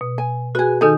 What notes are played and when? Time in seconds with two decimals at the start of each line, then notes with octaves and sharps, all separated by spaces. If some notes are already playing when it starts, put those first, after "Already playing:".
0.01 B2
0.18 G#5
0.55 F#4 G#4 B4 G#5
0.81 D#3 D#4 A4 G#5 G6